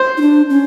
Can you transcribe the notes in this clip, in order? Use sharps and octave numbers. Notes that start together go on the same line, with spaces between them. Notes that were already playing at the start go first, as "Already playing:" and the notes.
Already playing: C5
D#4
D4
C#4